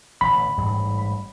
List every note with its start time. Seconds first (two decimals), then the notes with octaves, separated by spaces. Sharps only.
0.21 A1 D3 B5
0.58 A1 G#2 G3